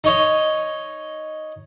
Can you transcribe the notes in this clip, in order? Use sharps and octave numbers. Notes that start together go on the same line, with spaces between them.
D#4 C#5 D#5